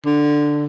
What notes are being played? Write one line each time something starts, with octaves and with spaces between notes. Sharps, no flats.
D3